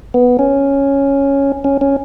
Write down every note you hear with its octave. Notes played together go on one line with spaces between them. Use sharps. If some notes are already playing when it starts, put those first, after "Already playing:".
B3
C#4
C#4
C#4